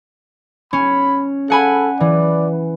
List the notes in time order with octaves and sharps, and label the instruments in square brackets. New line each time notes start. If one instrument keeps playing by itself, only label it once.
[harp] C#4 [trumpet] B5
[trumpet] A4 [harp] F#5 G#5 B5
[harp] E3 [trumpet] D5